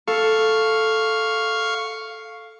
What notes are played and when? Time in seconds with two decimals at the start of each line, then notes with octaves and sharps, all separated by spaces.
0.08 A4 F5 C#6